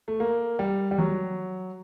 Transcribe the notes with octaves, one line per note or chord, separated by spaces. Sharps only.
A3
A#3
G3
G3
F#3